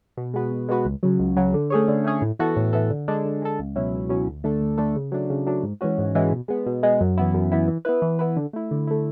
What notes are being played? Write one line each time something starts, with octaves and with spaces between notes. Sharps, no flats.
B2
G#3 B3 F#4 B4
B2
G#3 B3 F#4 B4
C#2
C#3 F#3
C#2
C#3 F#3
D3
A3 C#4 G#4 C#5
D3
A3 C#4 G#4 C#5
A2
E3 B3 F#4 A4
A2
E3 B3 F#4 A4
D3
G#3 D4 A4
D3
G#3 D4 A4
C#2
B2 F#3 C#4 E4
C#2
B2 F#3 C#4 E4
D2
D3 A3 D4 A4
D2
D3 A3 D4 A4
C#3
F#3 A3 D4
C#3
F#3 A3 D4
G#2
E3 G#3 C#4 F#4
G#2
E3 G#3 C#4 F#4
B2
G#3 B3
B2
G#3 B3
F#2
E3 B3 E4
F#2
E3 B3 E4
E3
B3 E4 B4
E3
B3 E4 B4
D3
A3 E4
D3
A3 E4